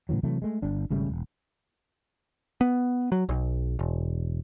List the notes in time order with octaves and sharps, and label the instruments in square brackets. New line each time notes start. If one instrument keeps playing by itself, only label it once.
[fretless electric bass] A2 C#3 E3 F#3
C3 E3 F#3 A3
G#3 A3
G1 D4
G#1 C#3 G3 A3
E1
[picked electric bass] B3
F#3
B1
E1